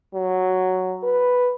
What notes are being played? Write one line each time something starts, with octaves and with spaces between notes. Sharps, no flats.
F#3
B4